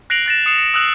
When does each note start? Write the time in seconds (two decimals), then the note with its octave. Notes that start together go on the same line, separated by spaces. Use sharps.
0.10 F#6 A#6 C7 D7 F7 F#7
0.26 F#6 A6 A#6 E7
0.46 D#6 C7 C#7 E7
0.58 C#7
0.74 D#6 E6 F#6 F#7